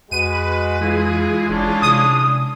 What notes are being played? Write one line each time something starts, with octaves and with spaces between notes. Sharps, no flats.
F2 G#3 F#4 B4 D#7
E3 G#3 F4 G#4
F#1 C#4 D4 F4
C3 D#6